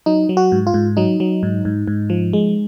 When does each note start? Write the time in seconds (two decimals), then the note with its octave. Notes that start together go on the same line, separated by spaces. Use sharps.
0.06 F#3 D#4
0.29 F#3
0.37 F#4
0.52 G#2
0.67 F4
0.74 G#2
0.97 F#3 D#4
1.20 F#3
1.43 G#2
1.65 G#2
1.88 G#2
2.10 F3
2.33 G#3